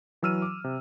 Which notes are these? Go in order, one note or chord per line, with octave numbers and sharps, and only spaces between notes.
E3 F#3 E6 F6 D#7
D6
C3